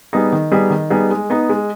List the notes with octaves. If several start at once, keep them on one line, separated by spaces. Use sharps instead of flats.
G3 B3 D#4 G#4
D#3
G3 B3 D#4 G#4
D#3
G3 B3 D#4 G#4
G#3
B3 D#4
G#3